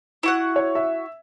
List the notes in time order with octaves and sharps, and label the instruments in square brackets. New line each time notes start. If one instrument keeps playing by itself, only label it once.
[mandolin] E4 F#4 F#5
[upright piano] C#5
E5